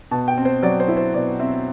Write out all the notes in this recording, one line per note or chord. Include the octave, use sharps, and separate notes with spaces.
B2 A5
G5
C4
C5
F#3 D5
C5
E4
C5
B2 D5
C4 E5